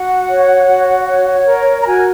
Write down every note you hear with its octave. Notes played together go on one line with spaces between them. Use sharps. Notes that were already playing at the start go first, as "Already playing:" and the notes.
Already playing: F#4 F#5
C#5
F#4
C#5
A#4
A#5
F#4 G#5